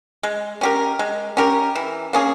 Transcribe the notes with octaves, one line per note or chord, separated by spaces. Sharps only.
G#3
C#4 G4 A#4
G#3
C#4 G4 A#4
E3
A#3 C#4 G#4